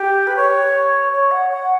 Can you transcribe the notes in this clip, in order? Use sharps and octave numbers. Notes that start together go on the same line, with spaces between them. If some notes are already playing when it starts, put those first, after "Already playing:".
Already playing: G4
B4
C#5
C#5
F#5
F#5